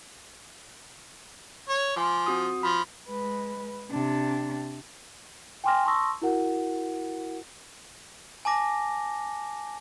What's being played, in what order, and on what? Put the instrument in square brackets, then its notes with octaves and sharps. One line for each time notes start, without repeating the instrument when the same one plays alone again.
[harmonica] C#5
[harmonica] F3 [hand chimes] G#5 C6 D6
[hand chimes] C4 F#4 D#6
[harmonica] F3 [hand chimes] B5
[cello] G#3 B4
C3 D4
[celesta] G5 G#5 C6 D6 F6 A#6
A5 C6 C#6 D#6 E6 A#6
E4 F#4 A#4 F#5
[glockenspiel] G#5 A5 D6 A#6